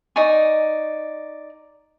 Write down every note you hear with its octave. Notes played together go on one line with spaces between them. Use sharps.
D#4 D5 G#5 C#6